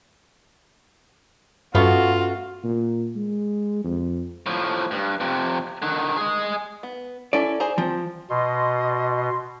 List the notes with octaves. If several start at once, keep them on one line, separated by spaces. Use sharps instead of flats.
G2 A3 B3 C#4 F4 F#4
A#2
G#3
F2
A2 F3
G2
F2 C3
D3 D#3
G#4 D#5
B3
C#4 E4 A4 D5
G#4 C5 A#5
F3 C4
B2 D#5 C6